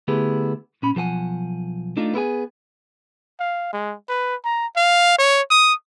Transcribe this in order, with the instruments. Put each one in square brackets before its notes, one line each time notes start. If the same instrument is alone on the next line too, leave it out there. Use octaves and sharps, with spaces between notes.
[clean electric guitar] D3 A3 B3 E4 G4 G#4
A#2 C#4 B5
B1 F3 A4 F#5 G#5
A3 D4 D#4 F4
B3 E4 G#4 G#5
[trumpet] F5
G#3
B4
A#5
F5
C#5
D#6